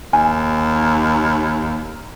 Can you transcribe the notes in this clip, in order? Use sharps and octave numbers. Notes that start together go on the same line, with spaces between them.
D#2 G#5